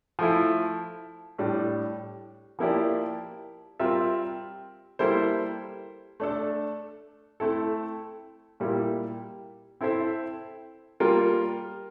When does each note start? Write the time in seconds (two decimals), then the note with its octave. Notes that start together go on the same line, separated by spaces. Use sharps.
0.19 F3 A3 E4
1.39 A2 G3 D4
2.59 F3 A#3 E4 G4 D5
3.80 G3 C4 F4 A#4 E5
4.99 G3 A#3 E4 A4 C5
6.20 A3 D4 A4
7.40 A3 C4 E4 A4
8.60 A#2 G3 A#3 E4 G4
9.81 C4 E4 A4 C5 E5
11.00 G3 A#3 F4 A#4